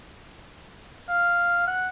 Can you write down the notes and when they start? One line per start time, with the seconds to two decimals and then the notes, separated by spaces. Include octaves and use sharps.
1.09 F5
1.67 F#5